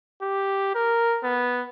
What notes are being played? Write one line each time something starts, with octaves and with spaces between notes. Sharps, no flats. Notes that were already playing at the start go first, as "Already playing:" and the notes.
G4
A#4
B3